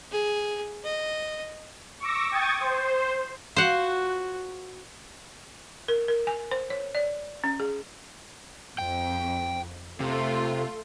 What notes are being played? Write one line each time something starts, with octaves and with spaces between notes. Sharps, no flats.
G#4
D#5
C#6 D6 E6 A#6
G5 C#6 D#6 G#6 A6
C5
F4 F#4 C5 F#5
A#4
A#4
G#5
C5
C#5
D5
C#4
G#4
F2 G5
C3 A3 F4